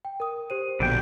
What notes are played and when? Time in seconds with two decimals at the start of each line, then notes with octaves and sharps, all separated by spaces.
0.05 G5
0.20 A#4 D#6
0.50 G4 C5 D#7
0.80 A#1 B2 D3 G5